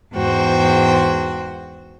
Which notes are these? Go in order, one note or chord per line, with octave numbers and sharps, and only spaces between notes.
E2 G#2 F#4 C5 G5